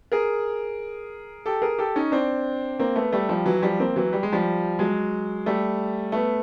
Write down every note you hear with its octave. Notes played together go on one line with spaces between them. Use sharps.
G#4 A#4
G4 A4
G#4 A#4
G4 A4
C#4 D#4
C4 D4
A#3 C4
A3 B3
G3 A3
F3 G3
E3 F#3
F3 G3
A#3 C4
E3 F#3
G3
G#3
F3 G3
F#3 G#3
G3 A3
A3 B3